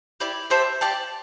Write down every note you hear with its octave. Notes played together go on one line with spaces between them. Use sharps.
E4 G4 D5
G4 C5 E5 A5
G4 D5 A5